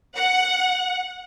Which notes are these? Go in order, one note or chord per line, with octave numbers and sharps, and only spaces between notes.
F#5